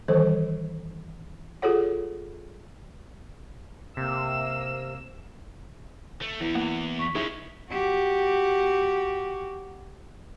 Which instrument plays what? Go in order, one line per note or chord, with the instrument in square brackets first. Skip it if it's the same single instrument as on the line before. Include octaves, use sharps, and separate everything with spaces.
[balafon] D#3 E3 G3 A4 C5
F4 F#4 G#4 A4 C#5 F#5
[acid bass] C3 [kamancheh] A#3 E6
[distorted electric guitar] A3
[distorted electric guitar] E2 [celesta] E4
[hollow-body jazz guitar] A#3 F#5
[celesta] C#6 B6
[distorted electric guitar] G#3 C#4 [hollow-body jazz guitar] D#4 E4 G#4
[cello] F#4 G4